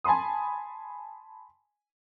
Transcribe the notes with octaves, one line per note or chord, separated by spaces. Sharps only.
G#5 A5 B5 C6 D#6